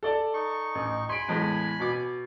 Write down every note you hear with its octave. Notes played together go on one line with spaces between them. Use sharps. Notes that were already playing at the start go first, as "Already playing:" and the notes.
A4 D5 A5
D#4 C#6
A1
G#5 B5 C6 D7
E2 A2 G#3
B2 D6